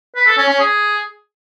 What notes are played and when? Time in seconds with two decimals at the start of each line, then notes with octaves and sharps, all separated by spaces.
0.16 B4
0.27 A4
0.38 C#4
0.49 C#4
0.60 G#4